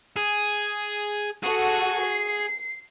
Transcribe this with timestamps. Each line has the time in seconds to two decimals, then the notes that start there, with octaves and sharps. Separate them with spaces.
0.16 G#4
1.43 F#4 G#4 A4
2.05 C7